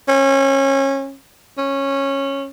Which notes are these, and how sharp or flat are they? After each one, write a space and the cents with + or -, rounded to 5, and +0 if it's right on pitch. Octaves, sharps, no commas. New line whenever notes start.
C#4 -25
C#4 -15